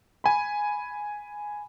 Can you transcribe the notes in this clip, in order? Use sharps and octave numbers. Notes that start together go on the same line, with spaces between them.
G#5 B5